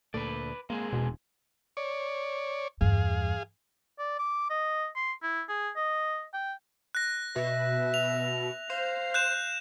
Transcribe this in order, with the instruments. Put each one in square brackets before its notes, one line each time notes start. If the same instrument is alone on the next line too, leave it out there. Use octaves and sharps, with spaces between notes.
[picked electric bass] D2 A#2 A3 [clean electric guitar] B4 D5
[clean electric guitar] G#3 C4 G#4 [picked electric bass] A#3
[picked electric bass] E1 [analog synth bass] B2
[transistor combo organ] C#5 D5
[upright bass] E2 G2 [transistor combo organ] G#4 F5
[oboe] D5
D6
D#5
C6
E4
G#4
D#5
G5
[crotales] F#6 A#6
[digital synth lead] B2 [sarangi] E5
[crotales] F7
[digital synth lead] C5 [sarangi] F5
[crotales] F#6 G6 E7